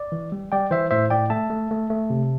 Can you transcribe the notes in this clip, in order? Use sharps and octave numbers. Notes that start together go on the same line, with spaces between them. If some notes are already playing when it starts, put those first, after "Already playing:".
Already playing: D5
E3
G3
G3 D5 G5
E3 C5 E5
A2 C5 E5
A2 D5 G5
A3 E5 A5
A3
A3
A3
C3